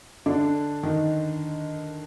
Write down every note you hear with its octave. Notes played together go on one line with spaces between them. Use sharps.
D3 D4
D#3 D#4